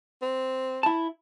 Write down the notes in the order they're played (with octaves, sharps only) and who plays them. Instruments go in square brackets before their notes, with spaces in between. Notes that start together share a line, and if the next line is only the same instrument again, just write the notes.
[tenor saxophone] C4
[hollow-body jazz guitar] E4 A5